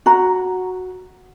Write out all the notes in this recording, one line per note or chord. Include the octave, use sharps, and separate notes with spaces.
F#4 A#5